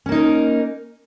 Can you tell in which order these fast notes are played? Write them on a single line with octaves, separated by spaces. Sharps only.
C#4 A#3 D#4 A#4